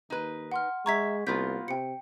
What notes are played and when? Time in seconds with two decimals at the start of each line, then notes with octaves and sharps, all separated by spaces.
0.10 D#2 D#4 B4
0.52 F#5 C6 F6
0.86 G#3 E5 A#5 C#6 G#6 B6
1.27 C2 A#3 B3 F4 G6 B6
1.68 C3 G5 C#7